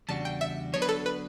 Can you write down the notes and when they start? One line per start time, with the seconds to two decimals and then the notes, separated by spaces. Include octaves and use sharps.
0.09 E2 C#3 G3 D4 F#4 A5
0.25 G5
0.41 E5
0.73 D3 F#3 B3 D4 C#5
0.82 B4
0.89 A4
1.06 B4